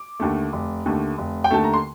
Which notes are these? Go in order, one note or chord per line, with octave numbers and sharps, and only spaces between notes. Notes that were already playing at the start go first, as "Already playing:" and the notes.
Already playing: D6
D#2 D3 A3
F1
D#2 D3 A3
F1
G5
D#2 D3 A3 A5
A#5
C6